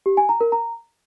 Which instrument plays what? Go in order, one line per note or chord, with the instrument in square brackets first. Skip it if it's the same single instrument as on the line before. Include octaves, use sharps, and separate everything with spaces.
[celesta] G4
G#5
A#5
A#4
A#5